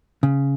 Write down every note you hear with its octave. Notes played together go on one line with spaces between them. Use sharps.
C#3